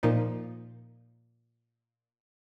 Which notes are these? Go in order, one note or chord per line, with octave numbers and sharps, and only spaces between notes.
A#2 F3 A#3 D#4